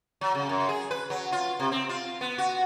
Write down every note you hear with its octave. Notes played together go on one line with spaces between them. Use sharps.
F#3
C#3
F#2
G#4
B4
F#3
F4
C3
C4
F4
B3
F#4